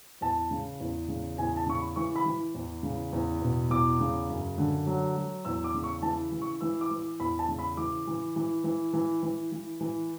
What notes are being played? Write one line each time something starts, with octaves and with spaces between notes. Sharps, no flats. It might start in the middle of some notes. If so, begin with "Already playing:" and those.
E2 A5
C#3
E2
C#3
E2 G#5
A5
C#3 C#6
B5
E3 C#6
B5
E3
E2
C#3
E2
B2
E2 D6
C#3
F#2
D3
F#3
F#3
E2 E6
D6
C#3
C#6
E3 A5
E3
C#6
E3 E6
D6
E3
D6
E2 B5
A5
C#3
B5
E3 D6
E3
E3
E3
E3
E3
E3
E3